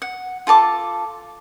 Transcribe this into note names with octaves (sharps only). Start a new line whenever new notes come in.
F#5
F4 A4 A5 D6